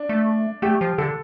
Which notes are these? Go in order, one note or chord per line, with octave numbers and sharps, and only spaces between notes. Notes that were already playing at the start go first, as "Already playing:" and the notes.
Already playing: D4
A3
A3 G4
F3
D3 A4